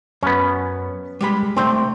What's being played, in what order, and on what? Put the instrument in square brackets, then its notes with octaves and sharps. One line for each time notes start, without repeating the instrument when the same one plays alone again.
[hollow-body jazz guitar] F#2 [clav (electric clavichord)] B3 C#4
[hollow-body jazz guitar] G3 G#3 B5
[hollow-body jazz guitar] C3 A3 D4 [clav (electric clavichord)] C4